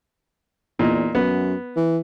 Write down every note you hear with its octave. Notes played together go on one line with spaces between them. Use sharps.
E2 A#2 D#4
F#2 B3
E3